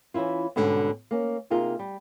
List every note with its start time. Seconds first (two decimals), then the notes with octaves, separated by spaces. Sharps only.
0.14 E3 C#4 D4 E4 F4
0.56 G#2 B2 D3 G3 C#4 D4
1.11 A#3 C#4
1.50 C3 A#3 D#4 F4 G#4 A#4
1.79 G3